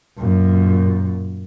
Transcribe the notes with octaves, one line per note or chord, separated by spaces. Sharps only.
F#2 A#2